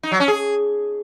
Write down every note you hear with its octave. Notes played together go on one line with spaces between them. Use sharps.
D#4
F#3
C#4
G#4